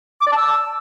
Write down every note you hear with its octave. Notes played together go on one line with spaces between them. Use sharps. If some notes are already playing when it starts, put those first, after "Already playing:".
D6
D5
A5
E6